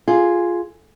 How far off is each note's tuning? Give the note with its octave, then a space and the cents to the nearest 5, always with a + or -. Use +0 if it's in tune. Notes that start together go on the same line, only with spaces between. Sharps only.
F4 +0 G#4 +0